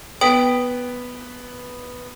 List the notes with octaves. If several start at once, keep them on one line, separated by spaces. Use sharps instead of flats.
B3 G5 D#6 B6 D7 F#7